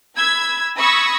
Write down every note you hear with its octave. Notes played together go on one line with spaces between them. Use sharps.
B5 E6 G#6
B5 C#6 D#6 E6 G#6 A#6